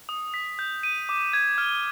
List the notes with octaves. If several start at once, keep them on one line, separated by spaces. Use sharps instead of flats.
D#6
B6
G6
D#7
D6
G#6
F6